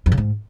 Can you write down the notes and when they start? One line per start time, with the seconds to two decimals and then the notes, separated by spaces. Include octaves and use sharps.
0.06 F2
0.12 C#3
0.17 G#2